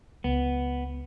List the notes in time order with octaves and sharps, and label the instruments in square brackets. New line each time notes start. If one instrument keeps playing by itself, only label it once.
[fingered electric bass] C#2 [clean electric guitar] B3